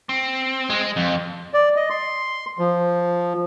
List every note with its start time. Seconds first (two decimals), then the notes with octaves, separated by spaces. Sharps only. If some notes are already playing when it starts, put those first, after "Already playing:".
0.09 C4
0.70 G#3
0.97 F2
1.54 D5
1.76 D#5
1.90 C6
2.59 F3